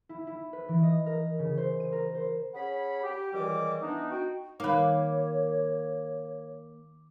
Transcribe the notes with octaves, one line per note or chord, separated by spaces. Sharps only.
E4
E4
B4
E3
D#5
A#4
C#3
C5
D#7
A#4
C5
C#4 G#4 F#5 B5
G4
C#2 D#3 E3 G3 D#5 D6
E3 B3 D4 D#4
D#4 F#4 G5
D#3 A#3 D#4 B4 C#5 D6